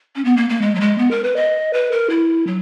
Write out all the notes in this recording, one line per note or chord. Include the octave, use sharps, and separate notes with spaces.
C#4
B3
A#3
A#3
G#3
F#3
G#3
B3
A#4
B4
D#5
B4
A#4
E4
F#3